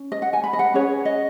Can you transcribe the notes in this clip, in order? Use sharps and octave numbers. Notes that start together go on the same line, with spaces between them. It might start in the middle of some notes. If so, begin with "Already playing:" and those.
Already playing: C#4
D#5
F#5
G#5
B5
D#5
F#5
C#4 G#4 B4 C#5
D#5